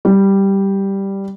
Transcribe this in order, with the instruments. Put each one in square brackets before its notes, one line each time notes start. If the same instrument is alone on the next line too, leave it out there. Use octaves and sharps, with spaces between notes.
[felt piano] G3